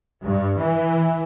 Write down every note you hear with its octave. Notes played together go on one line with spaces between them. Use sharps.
G2
E3